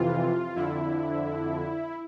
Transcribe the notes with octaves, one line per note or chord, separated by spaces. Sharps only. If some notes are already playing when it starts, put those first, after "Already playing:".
Already playing: F2 C3 E3 F4
F2 D3 E4